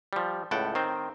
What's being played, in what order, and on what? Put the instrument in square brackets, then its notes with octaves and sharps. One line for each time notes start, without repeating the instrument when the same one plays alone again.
[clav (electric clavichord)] F3 G3
C#2 A2 F#5 G5 A5
D#3 C4 C5